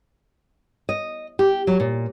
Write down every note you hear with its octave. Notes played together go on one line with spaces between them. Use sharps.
D#5
G4
F#3
A#2